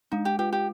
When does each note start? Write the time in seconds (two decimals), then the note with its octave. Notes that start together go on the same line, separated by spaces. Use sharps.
0.12 G#3 D#4
0.25 G4
0.39 F4 G4
0.53 G4